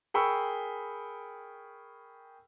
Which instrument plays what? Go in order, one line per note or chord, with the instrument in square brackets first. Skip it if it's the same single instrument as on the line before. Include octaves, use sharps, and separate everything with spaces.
[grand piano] G#4 A#4 G5 B5 C#6 E6